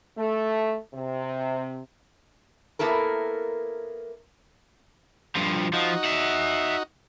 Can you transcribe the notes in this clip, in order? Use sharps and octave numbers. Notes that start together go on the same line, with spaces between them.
A3
C3
A#3 B3 E4 A4 A#4
G2 F3
F3 D#4 F#4
E5 F#5